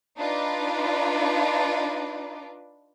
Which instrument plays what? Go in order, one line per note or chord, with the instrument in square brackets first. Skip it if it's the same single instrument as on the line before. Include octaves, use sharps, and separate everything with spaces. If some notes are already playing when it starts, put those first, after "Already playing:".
[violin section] D4 D#4 F4 B4 D5